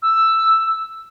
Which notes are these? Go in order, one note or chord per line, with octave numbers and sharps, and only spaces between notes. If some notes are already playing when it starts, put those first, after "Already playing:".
E6